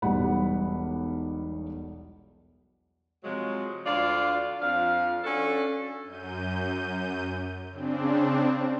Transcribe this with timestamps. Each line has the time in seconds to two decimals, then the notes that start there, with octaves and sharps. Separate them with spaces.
0.02 E1 B1 G3 F#5 B5
3.23 C3 F3 F#3 G#3
3.85 D2 D4 F4 D5 F5
4.60 F2 F3 D4 F5
5.24 C#4 D4 F#4 A4
6.04 F#2 G6 D#7
7.70 C#3 C4 D4